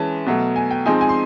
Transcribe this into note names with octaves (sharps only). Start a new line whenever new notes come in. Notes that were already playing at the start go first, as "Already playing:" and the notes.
Already playing: E3 G#3 C#4 A5
B2 F#3 A3
G#5
G5
F3 G#3 C4 D#4 G#5
G#5
C6